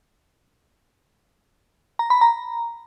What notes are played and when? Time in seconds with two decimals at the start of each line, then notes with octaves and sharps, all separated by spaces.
1.99 A#5
2.10 B5
2.21 A#5